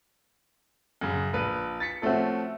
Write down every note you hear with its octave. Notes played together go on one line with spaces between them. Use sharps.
F#2 C#3
A#1 B4
A6 B6 C#7
F3 A3 C4 C#4 F#4